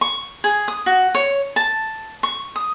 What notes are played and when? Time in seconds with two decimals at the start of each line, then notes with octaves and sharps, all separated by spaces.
0.01 C#6
0.44 G#4
0.68 D#6
0.86 F#4
1.15 C#5
1.56 A5
2.23 C#6
2.56 D#6